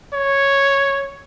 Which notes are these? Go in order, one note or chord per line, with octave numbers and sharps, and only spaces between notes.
C#5